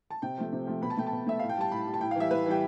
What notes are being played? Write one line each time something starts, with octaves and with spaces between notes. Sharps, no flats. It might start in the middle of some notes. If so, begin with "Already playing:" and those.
A5
C3 G5
F3 A3
C3
F3 A3
B2 B5
A5
A3 G5
A5
B2
A3 E5
A2 F5
G5
G3 A5
A2 B5
G3
A5
A2 G5
F5
E3 G3 E5
A2 B4
E3 G3 G5